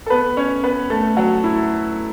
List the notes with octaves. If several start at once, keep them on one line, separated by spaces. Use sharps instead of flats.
A4
B3 B4
C#4 C#5
B3 B4
A3 A4
F#3 F#4
E4